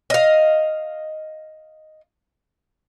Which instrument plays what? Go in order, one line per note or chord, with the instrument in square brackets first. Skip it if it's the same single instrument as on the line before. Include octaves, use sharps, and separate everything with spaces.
[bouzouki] D#5 F5